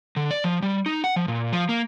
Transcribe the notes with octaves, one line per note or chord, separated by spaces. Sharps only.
D3
D5
F3
G3
D#4
F#5
F3
A#2
F3
A#3